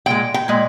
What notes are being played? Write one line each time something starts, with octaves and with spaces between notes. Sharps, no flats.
A#2 G#3 G5
G5
A#2 G#3